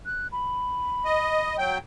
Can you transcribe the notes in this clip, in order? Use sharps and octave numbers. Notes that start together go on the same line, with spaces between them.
F#6
B5
D#5
F#3 G5